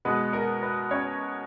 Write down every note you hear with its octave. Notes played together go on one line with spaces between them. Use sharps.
B2 G#3 B3 B4
A#4
B4
C#4 C#5